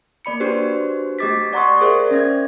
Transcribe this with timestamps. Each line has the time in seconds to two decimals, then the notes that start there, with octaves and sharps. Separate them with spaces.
0.25 A#3 D5 B5 C#7
0.40 D4 F#4 G4 B4 C5
1.19 A3 G4 D#5 D6 A6 B6
1.53 D5 F#5 A#5 C6 C#6 D#6
1.80 G#4 A#4 C5 D5 E5
2.11 C#4 E5 G#6